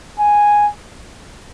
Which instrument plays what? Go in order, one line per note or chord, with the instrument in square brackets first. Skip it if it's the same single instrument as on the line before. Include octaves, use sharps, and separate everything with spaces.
[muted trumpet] G#5